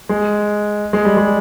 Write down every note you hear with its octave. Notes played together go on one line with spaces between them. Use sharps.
G#3
G#3
G3
G#3